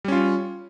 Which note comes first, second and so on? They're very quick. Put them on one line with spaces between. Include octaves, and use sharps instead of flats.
G3 C#4 F4